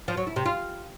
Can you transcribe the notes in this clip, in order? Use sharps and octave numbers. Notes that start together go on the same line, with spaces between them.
F3
F#3
E4
C3
F4